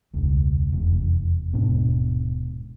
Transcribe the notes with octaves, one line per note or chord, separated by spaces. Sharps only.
E1 C#2
F1 E2
D#1 G#2 B2 D4